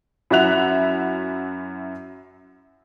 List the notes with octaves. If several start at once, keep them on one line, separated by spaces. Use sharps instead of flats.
F#2 E4 F#4 E5 F#6 F7